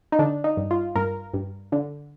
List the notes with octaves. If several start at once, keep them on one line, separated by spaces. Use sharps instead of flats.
D#4
D3 D4
D#4
G2
F4
G2 A#4
G2
D3